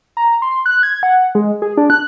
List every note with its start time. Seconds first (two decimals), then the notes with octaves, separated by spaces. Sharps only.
0.17 A#5
0.42 C6
0.66 F#6
0.83 G#6
1.03 F#5
1.35 G#3
1.62 G#4
1.77 D4
1.90 F#6